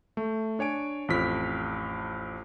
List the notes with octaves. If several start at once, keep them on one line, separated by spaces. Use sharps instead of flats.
A3
D4 C#5 G#5 D7
A1 F2 B6